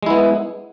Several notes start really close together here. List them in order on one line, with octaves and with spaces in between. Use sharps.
G#3 E4 B3